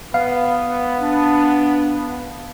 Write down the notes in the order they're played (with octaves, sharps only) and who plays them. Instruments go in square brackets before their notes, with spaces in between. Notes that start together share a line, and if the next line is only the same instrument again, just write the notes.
[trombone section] B3 [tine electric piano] F5
[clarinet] D4